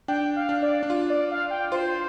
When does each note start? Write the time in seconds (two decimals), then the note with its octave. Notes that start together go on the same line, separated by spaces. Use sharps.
0.08 D4 G5
0.36 F5
0.49 D4
0.62 D5
0.83 D4
0.90 F4
1.10 D5
1.31 F5
1.50 G5
1.72 F4 C5